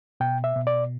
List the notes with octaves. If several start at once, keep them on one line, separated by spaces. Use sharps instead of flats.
B2 G5
E5
B2
D5